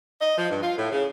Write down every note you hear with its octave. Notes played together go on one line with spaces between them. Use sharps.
D#5
F3
G2
F4
A2
C#3